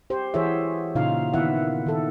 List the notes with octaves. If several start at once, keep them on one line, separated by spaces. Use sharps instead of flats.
G4 C5
E3 F#4 G#4 C5 C#5 E5
A#2 C#3 D#4 F4 F5
D#3 B3 E4 E5 F#5
D#3 A4